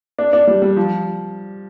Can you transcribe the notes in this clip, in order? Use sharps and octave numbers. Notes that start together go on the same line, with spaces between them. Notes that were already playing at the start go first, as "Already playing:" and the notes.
D4
D4
G3
G3
F3